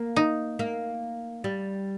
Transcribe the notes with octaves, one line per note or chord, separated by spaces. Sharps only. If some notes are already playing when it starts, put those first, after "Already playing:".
Already playing: A#3
D#4
A#3
G3